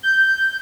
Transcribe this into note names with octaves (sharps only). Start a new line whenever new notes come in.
G6